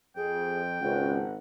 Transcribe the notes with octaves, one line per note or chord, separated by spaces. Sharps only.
F2 G#4 G5
G#1 C#2 C#4 F#5